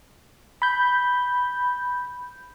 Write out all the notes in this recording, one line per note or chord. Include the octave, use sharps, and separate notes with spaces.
B5 G6